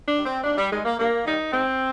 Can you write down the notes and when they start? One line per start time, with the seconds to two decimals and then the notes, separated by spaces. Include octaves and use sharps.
0.08 D4
0.17 D#3 G3
0.25 C4
0.43 D#2 D4
0.58 G3
0.71 D#3 G3 G#3
0.85 A#3
0.98 G2 A#3
1.26 D#3 G3 D#4
1.52 G#2 C4